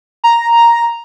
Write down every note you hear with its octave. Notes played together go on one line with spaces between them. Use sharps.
A#5